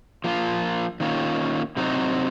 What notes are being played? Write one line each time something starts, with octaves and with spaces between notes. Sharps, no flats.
F3 A#3 F4
D#3 A#3 C#4 F4
C3 F#3 C4 D#4 F#4